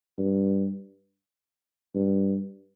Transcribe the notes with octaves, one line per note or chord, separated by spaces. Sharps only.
G2
G2